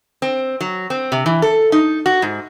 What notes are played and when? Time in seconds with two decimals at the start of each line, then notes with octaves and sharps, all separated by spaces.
0.22 C4
0.61 F#3
0.90 C4
1.12 C3
1.26 E3
1.42 A4
1.72 D#4
2.06 F#4
2.22 G#2